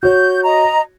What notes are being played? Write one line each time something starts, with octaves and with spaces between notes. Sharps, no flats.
F#4 C#5 G6
D#5 A#5